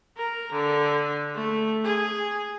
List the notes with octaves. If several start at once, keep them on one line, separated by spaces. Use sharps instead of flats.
A#4
D3
A3
G#4